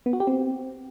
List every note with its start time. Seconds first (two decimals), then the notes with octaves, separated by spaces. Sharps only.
0.06 B3
0.13 F#4
0.20 G4
0.27 C4